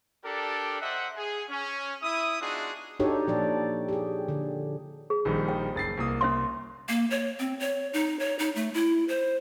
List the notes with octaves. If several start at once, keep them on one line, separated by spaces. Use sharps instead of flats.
D4 G4 A4 A#4 D5
C5 D#5 E5 F#5
G#4
C#4
E4 E5 D#6
B3 D4 D#4 F4 F#4 G#4
D4 D#4 F#4 G4 A4 C#5
A#2 F3 D5
G4 G#4
D3
G#4
A#1 D#3 G3
G5
F#1 A6 C7
C2 A#3 D#6
C#4 E5 C6
A#3
C#5
C4
C#5
D#4
C#5
D#4
A3
E4
C5